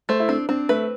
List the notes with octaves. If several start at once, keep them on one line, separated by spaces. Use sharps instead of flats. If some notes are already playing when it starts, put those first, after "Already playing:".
A3 C5
E4
C4 D4
C4 D4
A3 B4